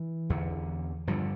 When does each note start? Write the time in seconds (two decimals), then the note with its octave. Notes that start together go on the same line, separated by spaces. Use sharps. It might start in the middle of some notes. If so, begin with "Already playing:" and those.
Already playing: E3
0.30 E2 D3
1.07 G2 D3 F3